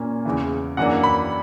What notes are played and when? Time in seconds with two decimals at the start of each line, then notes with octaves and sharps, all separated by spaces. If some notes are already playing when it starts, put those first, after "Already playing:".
Already playing: A#2 A#3 C#4
0.25 E2 C#3 E3
0.77 F#2 E3 A#3 D4 F#5
1.04 B5